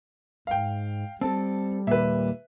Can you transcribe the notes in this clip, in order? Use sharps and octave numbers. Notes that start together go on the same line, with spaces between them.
G#2 F5 G5
G3 C4 A4 A5
D#2 A#2 B4 E5